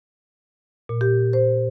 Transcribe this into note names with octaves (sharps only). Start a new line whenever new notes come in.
A#2
G4
C5